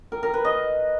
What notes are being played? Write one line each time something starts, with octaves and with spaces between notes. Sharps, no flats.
A#4
A#4
B4
D#5